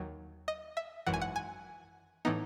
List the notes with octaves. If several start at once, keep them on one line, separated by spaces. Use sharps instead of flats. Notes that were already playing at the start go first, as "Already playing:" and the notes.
Already playing: D#2 D#3 F#3
D#5
E5
G#1 F#2 E3 F#5
G#5
F#5
G#5
A2 E3 B3 D#4